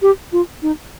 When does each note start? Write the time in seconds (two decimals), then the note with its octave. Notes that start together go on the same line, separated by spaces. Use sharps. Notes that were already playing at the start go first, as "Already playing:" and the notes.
0.02 G4
0.32 F4
0.62 D#4